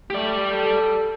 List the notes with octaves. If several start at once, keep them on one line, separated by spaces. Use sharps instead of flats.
A3 G4 D5
A4